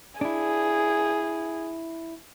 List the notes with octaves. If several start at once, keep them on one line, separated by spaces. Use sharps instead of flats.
D4 E4 G#4